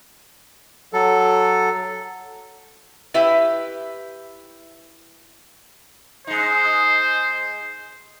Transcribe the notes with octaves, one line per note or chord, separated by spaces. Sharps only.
F#3 A4
E4 G4 B4 E5
G#3 D#4 C5